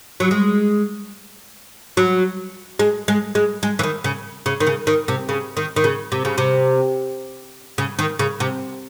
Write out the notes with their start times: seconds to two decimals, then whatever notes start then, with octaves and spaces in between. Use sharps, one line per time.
0.20 F#3
0.31 G#3
1.97 F#3
2.79 G#3
3.08 G#3
3.35 G#3
3.63 G#3
3.79 E3
3.83 D#3
4.04 C#3
4.46 C#3
4.60 D#3
4.67 C#3
4.87 D#3
5.08 C3
5.29 C#3
5.57 D#3
5.76 D#3
5.84 C#3
6.12 C3
6.25 C#3
6.38 C3
7.78 C#3
7.99 D#3
8.19 C#3
8.40 C3